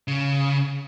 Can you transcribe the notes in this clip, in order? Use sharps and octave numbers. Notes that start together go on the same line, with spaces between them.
C#3